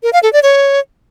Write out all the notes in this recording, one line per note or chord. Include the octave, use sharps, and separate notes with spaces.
A#4
F5
A4
D5
C#5